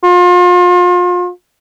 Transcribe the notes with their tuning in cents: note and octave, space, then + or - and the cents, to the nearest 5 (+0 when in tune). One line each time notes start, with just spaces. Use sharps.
F4 +35